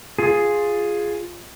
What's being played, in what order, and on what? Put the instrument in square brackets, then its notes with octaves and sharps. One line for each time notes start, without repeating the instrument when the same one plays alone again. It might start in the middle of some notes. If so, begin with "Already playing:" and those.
[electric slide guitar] F4 G#4